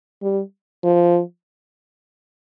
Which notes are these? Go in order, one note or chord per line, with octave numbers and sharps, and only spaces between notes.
G3
F3